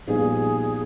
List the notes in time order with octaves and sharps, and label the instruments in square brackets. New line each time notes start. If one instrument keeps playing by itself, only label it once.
[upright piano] A#1 A#2 G3 B3 D#4 [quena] G#4